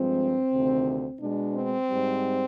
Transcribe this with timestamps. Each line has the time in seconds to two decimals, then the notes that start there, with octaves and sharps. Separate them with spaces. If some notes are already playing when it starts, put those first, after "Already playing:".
Already playing: G2 F3 G#3 C4
0.52 D2 C3 D#3
1.20 B2 G#3 D4
1.54 C4
1.88 G#2 G3